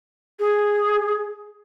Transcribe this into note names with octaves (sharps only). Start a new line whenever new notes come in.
G#4